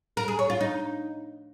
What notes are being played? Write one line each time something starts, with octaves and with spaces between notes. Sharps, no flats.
A#4
G#4
C#5
F4
D#4